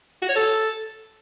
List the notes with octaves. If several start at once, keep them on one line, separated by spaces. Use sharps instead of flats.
F#4
C#5
A4